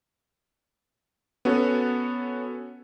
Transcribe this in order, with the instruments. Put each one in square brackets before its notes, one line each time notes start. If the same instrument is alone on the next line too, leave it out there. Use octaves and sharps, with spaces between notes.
[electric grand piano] B3 C#4 F#4 A4 C#5